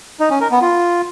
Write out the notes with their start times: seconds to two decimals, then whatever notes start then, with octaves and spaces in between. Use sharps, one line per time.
0.20 D#4
0.30 C#4
0.41 A#4
0.51 B3
0.62 F4